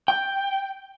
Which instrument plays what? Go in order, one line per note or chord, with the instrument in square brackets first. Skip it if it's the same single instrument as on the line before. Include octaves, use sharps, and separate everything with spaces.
[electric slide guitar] G5